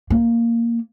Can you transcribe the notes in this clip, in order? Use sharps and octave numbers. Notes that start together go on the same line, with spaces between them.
A#3